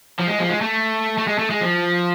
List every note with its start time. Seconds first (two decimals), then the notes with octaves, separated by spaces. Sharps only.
0.20 F3
0.28 G#3
0.39 F3
0.50 G#3
0.61 A3
1.18 A3
1.27 G#3
1.39 A3
1.50 G#3
1.61 F3